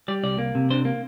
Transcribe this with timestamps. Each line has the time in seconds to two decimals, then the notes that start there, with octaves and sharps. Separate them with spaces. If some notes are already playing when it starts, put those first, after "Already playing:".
0.08 G3 D5
0.23 C2 D5
0.39 A#3
0.55 C3
0.70 D4 C5
0.85 A#3